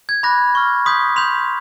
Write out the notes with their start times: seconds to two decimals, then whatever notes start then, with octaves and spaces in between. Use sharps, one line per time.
0.09 G#6
0.23 B5 D6 F#6 A#6
0.55 C#6 F6
0.86 C6 D#6 G6 B6
1.16 C6 D#6 G6 F7